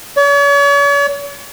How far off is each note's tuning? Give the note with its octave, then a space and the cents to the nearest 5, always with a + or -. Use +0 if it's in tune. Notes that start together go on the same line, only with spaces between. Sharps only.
C#5 +40